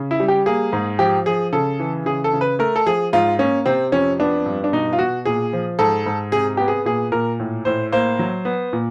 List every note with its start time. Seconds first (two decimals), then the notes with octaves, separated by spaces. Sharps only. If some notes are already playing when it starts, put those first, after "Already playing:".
Already playing: C#3
0.11 E4
0.20 G3
0.28 G4
0.46 A#3 G#4
0.73 G#2
0.99 F3 G4
1.26 F3 G#4
1.53 C#3 A4
1.79 E3
2.06 C#3 G#4
2.24 A4
2.33 C#3
2.41 B4
2.59 A3 A#4
2.76 A4
2.86 F3 G#4
3.13 G#2 F4
3.39 A#3 C#4
3.66 C3 C4
3.92 F2 C#4
4.20 B3 D4
4.46 G2
4.64 D4
4.73 B2 D#4
4.93 F4
4.99 B2 F#4
5.25 A#2 G#4
5.53 F3
5.79 G#2 A4
6.06 G#2
6.32 C3 G#4
6.57 B3 G4
6.68 G#4
6.85 A#2 G#4
7.12 A#2 A#4
7.40 A2
7.65 A2 C5
7.92 A#3 C5
8.19 F#3
8.45 B3
8.73 A#2